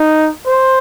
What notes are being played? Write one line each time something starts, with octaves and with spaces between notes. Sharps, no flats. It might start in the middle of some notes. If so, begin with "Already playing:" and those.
Already playing: D#4
C5